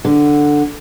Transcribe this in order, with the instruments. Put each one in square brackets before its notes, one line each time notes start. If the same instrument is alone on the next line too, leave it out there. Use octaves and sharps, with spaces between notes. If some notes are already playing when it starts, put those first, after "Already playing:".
[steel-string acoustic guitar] D3